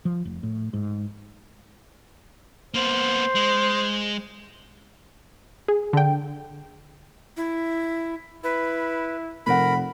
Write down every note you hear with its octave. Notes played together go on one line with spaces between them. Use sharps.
F3
F1
A2
G#2
A#3 B3 C5
G#3
G#4
D3 G5
E4
E4 B4
F1 A#4 F#5 B5